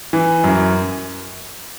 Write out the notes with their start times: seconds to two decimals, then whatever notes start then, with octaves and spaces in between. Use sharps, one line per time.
0.13 E3
0.44 F#2